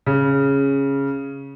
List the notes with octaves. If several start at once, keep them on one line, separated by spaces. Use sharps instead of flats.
C#3